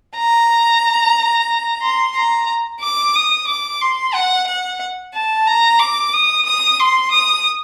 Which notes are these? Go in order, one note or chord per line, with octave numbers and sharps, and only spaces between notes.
A#5
C6
A#5
D6
D#6
D6
C6
F#5
F#5
A5
A#5
D6
D#6
D#6
C6
D#6